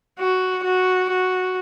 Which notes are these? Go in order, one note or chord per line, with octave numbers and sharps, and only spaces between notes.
F#4
F#4
F#4